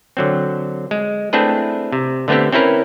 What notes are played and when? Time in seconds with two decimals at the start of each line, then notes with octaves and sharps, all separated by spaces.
0.17 D3 F#3 C4
0.91 G#3
1.33 A3 C4 D4 E4 G#4 B4
1.92 C3
2.28 D3 A3 B3 C4 G4
2.53 C4 C#4 E4 A#4 B4